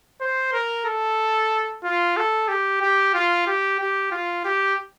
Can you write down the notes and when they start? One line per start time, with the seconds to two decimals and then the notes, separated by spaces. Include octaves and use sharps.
0.21 C5
0.53 A#4
0.86 A4
1.84 F4
2.17 A4
2.48 G4
2.81 G4
3.14 F4
3.47 G4
3.80 G4
4.11 F4
4.45 G4